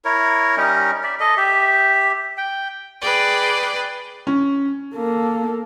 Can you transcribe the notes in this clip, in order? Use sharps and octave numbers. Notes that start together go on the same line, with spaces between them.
E4 A#4 C#5
G3 C#4 D#4 A#4
D5 E5
A4 D#5
G4 E5
G5
G#4 B4 D5 G5
C#4
A#3 A4